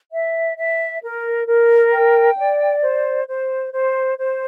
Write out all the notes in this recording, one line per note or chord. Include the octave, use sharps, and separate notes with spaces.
E5
E5
A#4
A#4
G5
D5
C5
C5
C5
C5